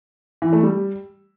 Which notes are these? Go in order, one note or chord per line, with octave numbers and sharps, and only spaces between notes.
E3
A3
G3